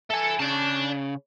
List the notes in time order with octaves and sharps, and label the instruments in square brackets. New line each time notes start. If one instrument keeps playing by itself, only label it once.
[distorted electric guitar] A4 [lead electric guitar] E5 G#5
[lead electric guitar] C#3 [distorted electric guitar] D5 A5